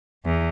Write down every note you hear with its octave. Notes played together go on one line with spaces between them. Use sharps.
E2